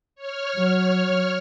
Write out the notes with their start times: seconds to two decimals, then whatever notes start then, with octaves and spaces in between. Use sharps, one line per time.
0.15 C#5 F6
0.57 F#3